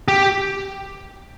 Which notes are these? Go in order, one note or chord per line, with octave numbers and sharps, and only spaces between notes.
G4